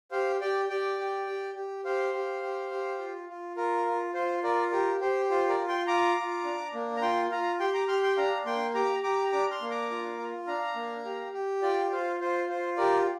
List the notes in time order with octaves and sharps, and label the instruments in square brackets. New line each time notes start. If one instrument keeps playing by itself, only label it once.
[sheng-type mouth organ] G4 C5 F5
G4 D5 G5
G4 D5 G5
G4
G4
G4
G4 C5 F5
G4
G4
G4
F4
F4
F4 A#4
F4
F4 C5
F4 A#4 D5
G4 A#4
G4 C5
F4 C5
A#4 D5
F4
G5 C6
F4 A#5 D6
F4
D4
A#3
A#5
F4 G5 C6
F4 F5 A#5
G4 G5 C6
A#5 D6
G4 C6 F6
G5 C6
D4 F5 A#5
A#3 G5 C6
G4 A#5 D6
G4 A#5 D6
D4 A#5 D6
C6 F6
A#3
A#5 D6
F4
F4
D4 F5 A#5
A#3
G4
G4
F4 D5 G5
F4 C5 F5
F4 C5
F4 C5
G4 A#4 D5